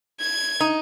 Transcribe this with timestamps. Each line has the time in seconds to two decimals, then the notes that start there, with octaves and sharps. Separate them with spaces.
0.20 G#6
0.61 D#4